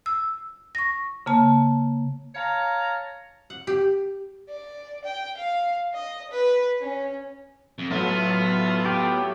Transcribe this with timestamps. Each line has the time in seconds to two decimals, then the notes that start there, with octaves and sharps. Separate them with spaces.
0.06 E6
0.75 C#6 A#6
1.26 C#3 A#3 A5
2.35 C#5 F5 A5 A#5
3.50 F#5
3.67 G4
4.49 D5
5.04 G5
5.37 F5
5.94 D#5
6.30 B4
6.81 C#4
7.79 F2
7.91 A2 F#3 A3 B3 F4 A4
8.85 G4